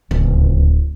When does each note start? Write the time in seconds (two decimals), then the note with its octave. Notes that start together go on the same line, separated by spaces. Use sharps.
0.11 D1 C#2